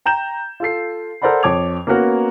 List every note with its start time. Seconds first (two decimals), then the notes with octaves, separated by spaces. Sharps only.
0.06 G5 A#5 G6 E7
0.60 F4 A4 C7
1.22 A4 A#4 C5 D5 F#5 B5
1.43 F2 C#5 A5 D6 G#6 F7
1.87 A#3 B3 C#4 F#4 A#4